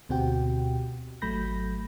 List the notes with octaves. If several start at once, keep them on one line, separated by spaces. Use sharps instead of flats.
D2 B2 C4 F#4 G4 G5
G#1 F#3 A3 B5 G6 A#6